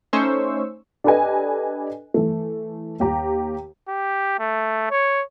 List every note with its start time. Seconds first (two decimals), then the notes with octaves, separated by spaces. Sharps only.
0.13 A3 C#4 D#4 C5 C#6 E6
1.04 D4 G4 A4 B4 D#5 G#5
2.14 E3 A3
3.00 D#2 G4 A#5
3.88 G4
4.39 A3
4.91 C#5